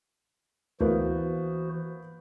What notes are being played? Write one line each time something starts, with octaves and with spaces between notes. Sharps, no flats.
D2 E3 A#3 B3 E4 F#4 C5